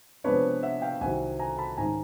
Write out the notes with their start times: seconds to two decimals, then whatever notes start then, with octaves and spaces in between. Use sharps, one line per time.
0.24 C3 F3 G#3 B3 D4 B4 C#5
0.63 E5 F#5
0.82 F5 G5
1.01 C2 C3 D#3 F#3 F#5 G#5
1.39 G#5 A#5
1.58 A5 B5
1.77 G#2 D#3 G#3 C#4 G#5 A#5